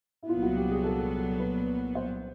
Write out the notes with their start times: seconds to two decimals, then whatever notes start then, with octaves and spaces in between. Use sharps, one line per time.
0.23 E4
0.29 C2 A#2 F#3 B3 F4
0.43 F#4
0.57 G4
0.71 G#4
0.84 A4
1.40 B4
1.95 C5